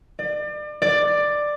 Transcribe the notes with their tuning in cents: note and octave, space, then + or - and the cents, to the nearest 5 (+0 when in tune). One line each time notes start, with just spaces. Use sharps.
D5 +35
D5 +10